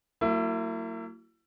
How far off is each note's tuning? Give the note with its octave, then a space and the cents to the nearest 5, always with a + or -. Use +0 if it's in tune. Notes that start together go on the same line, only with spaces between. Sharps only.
F#3 +5 A#3 -35 E4 +25